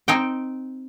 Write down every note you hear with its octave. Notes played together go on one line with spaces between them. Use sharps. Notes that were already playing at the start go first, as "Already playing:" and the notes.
C4 D#4 G5